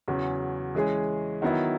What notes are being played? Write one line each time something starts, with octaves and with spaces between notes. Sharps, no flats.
E2 C#3 F#3 C#4
E3 G#3 C#4 G#4
D#3 F#3 B3 E4